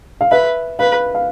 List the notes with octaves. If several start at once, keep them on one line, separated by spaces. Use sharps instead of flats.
F5
B4 E5
B4 F5
F5